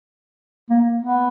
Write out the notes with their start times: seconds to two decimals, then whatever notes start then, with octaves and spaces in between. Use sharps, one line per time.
0.70 A#3
1.02 B3